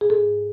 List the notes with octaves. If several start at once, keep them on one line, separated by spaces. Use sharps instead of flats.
G#4
G#2 A4